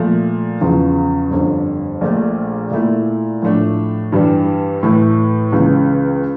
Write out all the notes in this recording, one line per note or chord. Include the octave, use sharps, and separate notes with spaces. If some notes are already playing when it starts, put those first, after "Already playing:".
Already playing: A#2 F3 A3
E2 C#3 F3
G1 F2 D3
A#1 A#2 A3
A#2 A3 E4
A2 F3 A3 D4
G2 E3 G3 D4
A2 E3 A3 E4 A4
C#2 C#3 E3